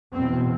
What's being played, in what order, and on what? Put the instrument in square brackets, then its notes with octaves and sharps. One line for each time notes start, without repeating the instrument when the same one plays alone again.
[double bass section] E2 B2 C4